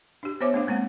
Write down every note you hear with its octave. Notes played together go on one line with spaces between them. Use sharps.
D4 G4
B3 C5 C#5 E5 D6
A3 D4 F5
G#3 A#3 C4 F#5